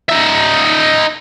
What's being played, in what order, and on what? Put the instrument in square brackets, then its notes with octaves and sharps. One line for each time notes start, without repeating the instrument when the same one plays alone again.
[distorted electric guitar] D#4 E5